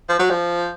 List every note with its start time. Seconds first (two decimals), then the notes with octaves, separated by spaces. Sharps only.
0.09 F3
0.19 F#3
0.30 F3